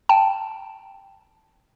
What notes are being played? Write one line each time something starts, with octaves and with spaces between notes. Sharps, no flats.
G5 A5